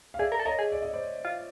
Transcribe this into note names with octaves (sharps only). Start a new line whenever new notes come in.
F5
G#4 D5 E5
A#4
A4
A#4 C#5 D#5
G#4
D5
D#5
C5 D5
F4